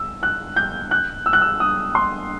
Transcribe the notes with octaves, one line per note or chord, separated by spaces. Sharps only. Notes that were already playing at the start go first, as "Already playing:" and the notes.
Already playing: E6
F#6
G6
F#6
E6
F#6
E6
D#6
C6